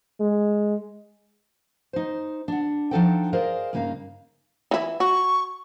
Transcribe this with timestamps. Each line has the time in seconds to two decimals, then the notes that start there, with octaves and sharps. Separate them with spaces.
0.20 G#3
1.93 D#4 C5
2.48 D4 F#5
2.91 F3 D4 D#4 A4 F#5 G5
3.33 G#4 A#4 C5 D5 D#5 F5
3.73 G2 C#3 A#3 D#4 F5
4.71 E3 E4
5.00 F#4 C#6